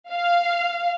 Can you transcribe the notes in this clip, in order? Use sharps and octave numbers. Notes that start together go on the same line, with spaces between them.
F5